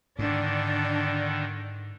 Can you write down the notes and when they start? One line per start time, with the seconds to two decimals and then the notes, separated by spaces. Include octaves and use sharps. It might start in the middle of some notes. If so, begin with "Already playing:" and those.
0.19 G#2 D3 D#3 D4